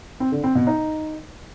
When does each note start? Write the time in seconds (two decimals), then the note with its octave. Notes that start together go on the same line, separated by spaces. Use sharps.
0.20 C4
0.32 D3
0.44 C4
0.55 B2
0.67 D#4